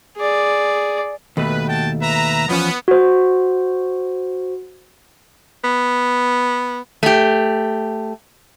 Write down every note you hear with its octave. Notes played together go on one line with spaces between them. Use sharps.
G#4 D5
D#2 B2 A3 B4
F#4 G5 A5
B4 E5 A#5
E2 F3 B3 C#4
F#4 C5
B3
A3 G4